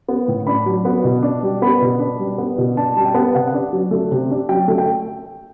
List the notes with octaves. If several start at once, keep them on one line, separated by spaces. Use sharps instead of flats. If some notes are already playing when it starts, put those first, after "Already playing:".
B3
A2
D4 B5
F#3
B3
B2
D4
G3
B3 B5
B2
D4
G3
B3
B2
D4 A5
G3 A5
G5
B3
C3 F#5
D4
F#3
A3
C3
D4
F#3 G5
A3
G5